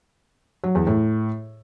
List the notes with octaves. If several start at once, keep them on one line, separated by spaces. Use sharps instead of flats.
F#3
E2
A2